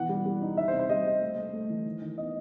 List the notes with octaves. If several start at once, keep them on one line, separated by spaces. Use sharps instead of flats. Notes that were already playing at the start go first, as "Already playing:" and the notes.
Already playing: B2 E3 F#5
G3
G3
D#4
D#4 E5
C5
C3
C5
G3 D#5
G3
A3
A3
A3
E3
D#3
D#3
B3 D#5